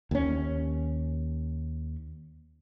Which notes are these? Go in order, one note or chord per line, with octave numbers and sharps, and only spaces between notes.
D#2 C#4